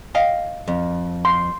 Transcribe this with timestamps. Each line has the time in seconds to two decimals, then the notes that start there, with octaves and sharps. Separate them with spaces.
0.15 D#5 F5 G5
0.68 F2
1.25 C6